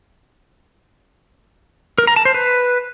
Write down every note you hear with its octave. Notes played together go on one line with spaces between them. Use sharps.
A#4
A#5
A5
C5
B4